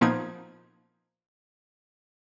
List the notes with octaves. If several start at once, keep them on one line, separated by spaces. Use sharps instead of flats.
A#2 F3 A#3 B3 D#4 G#6